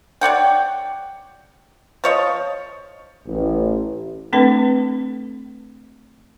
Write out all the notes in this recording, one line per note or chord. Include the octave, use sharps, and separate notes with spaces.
C#5 D5 F#5 G5
F3 C#5 D#5
A1
A3 C4 D4 A4 B4